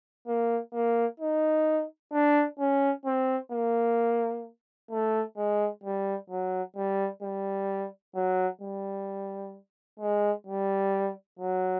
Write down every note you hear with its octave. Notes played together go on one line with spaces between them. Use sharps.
A#3
A#3
D#4
D4
C#4
C4
A#3
A3
G#3
G3
F#3
G3
G3
F#3
G3
G#3
G3
F#3